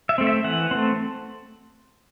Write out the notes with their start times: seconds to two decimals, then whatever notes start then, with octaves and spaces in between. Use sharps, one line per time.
0.09 E5
0.18 A3 C4
0.27 E5
0.44 E3 F#5
0.71 A3 C4